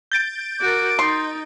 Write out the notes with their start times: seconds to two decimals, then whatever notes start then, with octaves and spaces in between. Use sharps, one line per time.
0.12 G6 A6 D7
0.61 F#4 A#4 D6
0.99 D#4 C6